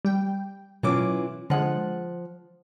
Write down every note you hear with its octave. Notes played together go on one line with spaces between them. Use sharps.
G3 G5
B2 E3 F#3 C#4 F4 D6
D3 F3 G#3 F#5